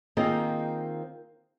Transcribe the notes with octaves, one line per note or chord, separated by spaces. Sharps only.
D#3 A#3 C4 F4 G#4 D#5